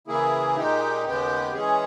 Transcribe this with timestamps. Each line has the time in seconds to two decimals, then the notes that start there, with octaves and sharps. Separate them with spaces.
0.07 C#3 E3 A#3 E4 G#4
0.56 A#2 G#3 D#4 G4
1.05 D#2 C#3 G#3 B3 G4
1.53 E3 G#3 C#4 G#4